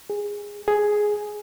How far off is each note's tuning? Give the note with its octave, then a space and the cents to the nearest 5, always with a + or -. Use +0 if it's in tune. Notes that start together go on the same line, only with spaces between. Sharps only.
G#4 -15
G#4 +5